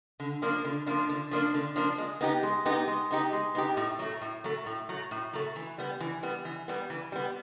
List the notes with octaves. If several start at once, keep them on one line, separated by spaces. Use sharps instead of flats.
D3
F3 A#3 D4
D3
F3 A#3 D4
D3
F3 A#3 D4
D3
F3 A#3 D4
G#3
B3 D#4 G4
G#3
B3 D#4 G4
G#3
B3 D#4 G4
G#3
B3 D#4 G4
A2
F#3 A3
A2
F#3 A3
A2
F#3 A3
A2
F#3 A3
E3
G3 B3
E3
G3 B3
E3
G3 B3
E3
G3 B3